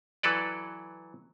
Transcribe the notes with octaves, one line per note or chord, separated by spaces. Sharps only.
E3 F#3 A4 B4 D5